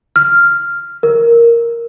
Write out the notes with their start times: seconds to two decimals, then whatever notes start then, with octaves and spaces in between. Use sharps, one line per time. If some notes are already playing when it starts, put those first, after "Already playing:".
0.16 F6
1.03 A#4